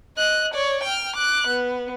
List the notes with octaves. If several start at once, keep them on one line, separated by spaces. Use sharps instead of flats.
D#5 F#6
C#5 D5
G5 F6
D6 F#6
B3